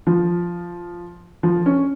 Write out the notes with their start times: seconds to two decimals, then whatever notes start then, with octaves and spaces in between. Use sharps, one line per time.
0.07 F3
1.43 F3
1.66 C#4